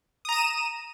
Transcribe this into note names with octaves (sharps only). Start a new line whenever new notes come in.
A#5 D#6 D#7 E7